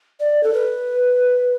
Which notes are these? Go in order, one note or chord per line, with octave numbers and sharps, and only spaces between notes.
D5
A4
B4